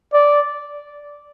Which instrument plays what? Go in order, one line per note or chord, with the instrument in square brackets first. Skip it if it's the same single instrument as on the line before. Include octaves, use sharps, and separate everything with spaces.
[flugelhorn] D5